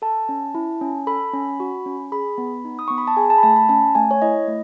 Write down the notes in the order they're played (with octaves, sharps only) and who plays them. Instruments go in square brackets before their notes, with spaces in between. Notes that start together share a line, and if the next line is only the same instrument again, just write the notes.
[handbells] A4 A5
C#4
E4
C#4
A4 B5
C#4
F#4
C#4
G#4 B5
B3
D#4
D#6
B3 C#6
B5
A5
G#4 G#5
A5
B5
A3 A5
B5
C#4 A5
A3 G#5
C#5
E4 D#5
A3